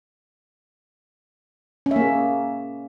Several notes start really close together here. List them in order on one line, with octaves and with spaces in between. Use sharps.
C#4 E5 A#3 G#4